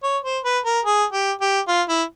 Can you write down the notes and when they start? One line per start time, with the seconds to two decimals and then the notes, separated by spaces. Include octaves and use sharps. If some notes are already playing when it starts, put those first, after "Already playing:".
0.03 C#5
0.24 C5
0.45 B4
0.65 A#4
0.85 G#4
1.13 G4
1.41 G4
1.68 F4
1.89 E4